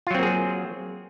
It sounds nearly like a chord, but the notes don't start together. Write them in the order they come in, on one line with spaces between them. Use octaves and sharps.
F4 F#3 C4 A#3 G#4